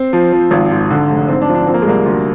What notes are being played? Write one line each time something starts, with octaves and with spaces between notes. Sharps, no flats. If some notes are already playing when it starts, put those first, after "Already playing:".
Already playing: C4
F3
F3
G#1
G#2
D3
F1
G#2 C4
D4
F3
D4
F3 C4
A#3
G#3
C2 A#3
D2